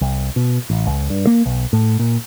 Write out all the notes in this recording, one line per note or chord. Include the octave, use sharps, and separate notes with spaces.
C2
B2
A1
C#2
G2
A#3
B1
A2
A#2